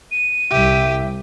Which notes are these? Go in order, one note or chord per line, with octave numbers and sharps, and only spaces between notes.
D#7
C2 G4 E5